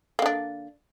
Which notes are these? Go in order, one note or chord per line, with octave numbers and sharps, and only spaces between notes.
D3 A#3 D4